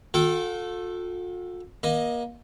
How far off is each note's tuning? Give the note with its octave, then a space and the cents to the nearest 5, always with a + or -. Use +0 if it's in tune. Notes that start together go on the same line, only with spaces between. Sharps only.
F4 +45 A4 +0 G5 -25
A#3 +30 D#5 +5